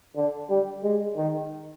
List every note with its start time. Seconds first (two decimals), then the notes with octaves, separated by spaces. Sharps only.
0.16 D3
0.50 G3
0.83 G#3
1.17 D#3